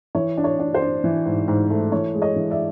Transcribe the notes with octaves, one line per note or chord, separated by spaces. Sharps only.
E3 C#5
D4
C#5
D4
C5
D4
E3
G#2
G#2
A3
E3 C#5
G#3
C#5 D#5
E3
D5 E5